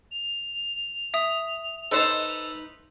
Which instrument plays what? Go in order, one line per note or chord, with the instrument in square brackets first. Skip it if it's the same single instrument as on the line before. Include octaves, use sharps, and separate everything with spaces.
[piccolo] F7
[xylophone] E5 D#6
[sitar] D#4 B4 [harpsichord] A4 C5 A5